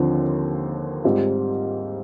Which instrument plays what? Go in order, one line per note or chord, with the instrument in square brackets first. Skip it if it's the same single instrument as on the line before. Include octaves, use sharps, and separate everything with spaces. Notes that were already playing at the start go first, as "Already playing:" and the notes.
Already playing: [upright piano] D#2 D3 F3 C4
G#2 G3 C4 F4